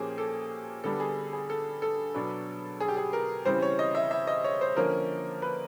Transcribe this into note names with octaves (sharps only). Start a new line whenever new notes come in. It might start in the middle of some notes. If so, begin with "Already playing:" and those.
Already playing: A#2 F3 A#3 C#4 G4 G#4
A4
D3 G3 B3 D4 A4
G#4
G#4
A4
A4
B2 F#3 B3 D4
G#4
G4
G#4
A#4
C#3 E3 G3 C4 C5
C#5
D#5
E5
E5
D#5
C#5
C5
D3 F3 A#3 C#4 A#4
B4